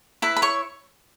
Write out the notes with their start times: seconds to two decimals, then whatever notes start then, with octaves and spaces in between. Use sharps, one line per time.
0.22 E4 B4 B5
0.36 B5
0.42 C#5 C#6